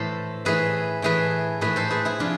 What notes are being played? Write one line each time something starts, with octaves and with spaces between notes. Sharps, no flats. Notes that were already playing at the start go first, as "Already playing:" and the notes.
Already playing: A2 E3 A4 C5
A2 E3 G#4 B4
A2 E3 G#4 B4
A2 E3 G#4 B4
A4 C5
G#4 B4
E4 G#4
C3 F3 D4 F4